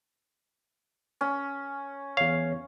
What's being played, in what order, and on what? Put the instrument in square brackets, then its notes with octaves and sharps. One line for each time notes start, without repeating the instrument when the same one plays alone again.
[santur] C#4
[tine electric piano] E2 C#5 [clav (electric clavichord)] F5